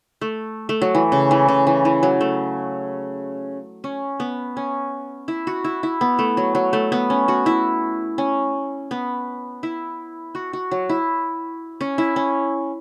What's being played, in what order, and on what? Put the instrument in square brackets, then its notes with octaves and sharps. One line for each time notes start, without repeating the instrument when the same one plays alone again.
[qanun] A3
A3
F#3
E3
C#3
E3
C#3
E3
E3
F#3
A3
C#4
B3
C#4
E4
F#4
E4
E4
B3
A3
F#3
F#3
A3
B3
C#4
F#4
E4
C#4
B3
E4
F#4
F#4
F#3
E4
C#4
E4
C#4